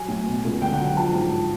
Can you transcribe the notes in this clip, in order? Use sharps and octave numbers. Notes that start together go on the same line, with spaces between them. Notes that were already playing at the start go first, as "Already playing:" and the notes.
Already playing: F#3 G#5
A2
B2
C#2
D3 G5
F#5
F#3
G5
F3 A5
G#2